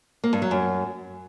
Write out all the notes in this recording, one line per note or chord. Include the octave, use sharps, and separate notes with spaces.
A#3
G2
F#3
F#2